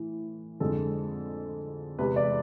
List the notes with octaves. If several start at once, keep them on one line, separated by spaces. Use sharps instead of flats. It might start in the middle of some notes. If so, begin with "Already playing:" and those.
Already playing: A2 E3
F2 D3 G#3 A4
E2 C3 E3 G#3 B4
D5